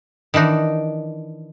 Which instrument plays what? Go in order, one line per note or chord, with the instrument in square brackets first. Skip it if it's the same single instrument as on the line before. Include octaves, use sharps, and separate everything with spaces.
[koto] D#3 E3 D4 D#4